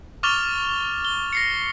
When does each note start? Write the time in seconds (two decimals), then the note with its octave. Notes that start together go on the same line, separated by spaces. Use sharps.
0.23 C#6 D6 F6 A6 F7 G7
1.05 G7
1.33 A#6 C7 C#7